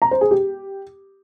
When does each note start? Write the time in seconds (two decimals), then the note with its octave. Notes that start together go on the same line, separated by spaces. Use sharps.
0.02 A#5
0.11 C5
0.21 G#4
0.31 G4